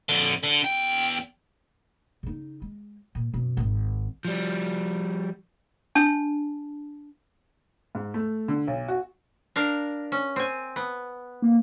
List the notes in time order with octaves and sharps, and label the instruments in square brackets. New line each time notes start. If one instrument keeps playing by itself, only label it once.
[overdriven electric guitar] F2 D3
D3
E2 G5
[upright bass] C#3 D#4
G#3
A#2
F#2 B2
G#1 D#3
[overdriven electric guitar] F3 G3
[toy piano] D4 A5
[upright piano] G#2
A3
D3
B1
F#4
[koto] D4 A#4 F5
C#4
C4 G#5
B3
[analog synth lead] A#3